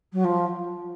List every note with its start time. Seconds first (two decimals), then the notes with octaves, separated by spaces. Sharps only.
0.13 F#3
0.24 F3